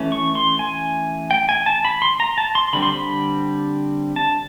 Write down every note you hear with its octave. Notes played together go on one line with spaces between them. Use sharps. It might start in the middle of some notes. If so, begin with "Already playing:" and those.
Already playing: E3 A3 C#4
C#6
C6
G#5
G5
G#5
A5
B5
C6
A#5
A5
C6
D3 G3 C4 B5
C6
B5
A5